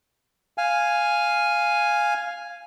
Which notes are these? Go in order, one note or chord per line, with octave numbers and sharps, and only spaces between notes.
F5 G#5